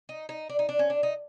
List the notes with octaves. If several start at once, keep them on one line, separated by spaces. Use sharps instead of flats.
D#4
D#4
D4
D#4
D4
C#4
D4
D#4